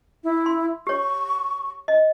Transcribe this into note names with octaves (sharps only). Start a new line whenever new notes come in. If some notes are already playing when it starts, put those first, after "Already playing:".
E4
C6
G4 C#5 C#6
D#5